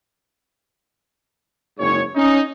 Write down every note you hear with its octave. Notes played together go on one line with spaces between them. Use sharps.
F#1 G#2 C#5
C#4 D#4